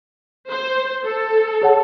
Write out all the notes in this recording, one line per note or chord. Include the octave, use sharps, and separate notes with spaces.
C5
A4
G#4 C#5 F#5 A5